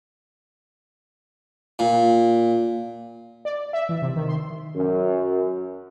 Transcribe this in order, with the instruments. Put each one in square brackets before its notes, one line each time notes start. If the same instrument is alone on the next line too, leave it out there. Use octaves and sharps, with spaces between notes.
[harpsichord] A#2
[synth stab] D5
E5
E3
C3
D#3
C6
[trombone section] F#2